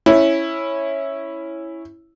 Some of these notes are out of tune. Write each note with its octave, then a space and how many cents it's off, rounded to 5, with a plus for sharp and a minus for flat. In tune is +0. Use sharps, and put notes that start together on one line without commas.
C#4 -10 E4 +0